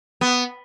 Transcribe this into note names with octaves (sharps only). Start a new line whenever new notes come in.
B3